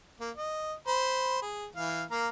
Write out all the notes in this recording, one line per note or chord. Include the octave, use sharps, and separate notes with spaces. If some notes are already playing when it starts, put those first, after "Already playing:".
A#3
D#5
C5 B5
G#4
E3 F5
A#3 F5 A#5